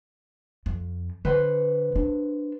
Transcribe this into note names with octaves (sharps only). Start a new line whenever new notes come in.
F2
D3 B4 C5 F#5
D4